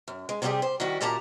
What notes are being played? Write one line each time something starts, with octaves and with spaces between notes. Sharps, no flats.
F#2
G#3
C3 G3 C4 F4 G4 G#4
C5
D#3 G3 E4 F#4
F#2 A#2 G4 A#4 A5 A#5